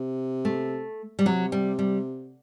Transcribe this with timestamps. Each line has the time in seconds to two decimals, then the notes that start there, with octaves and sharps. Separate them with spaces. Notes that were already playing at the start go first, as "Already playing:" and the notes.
Already playing: C3
0.45 A3
1.19 G3
1.25 C3 F#3
1.52 G3
1.79 G3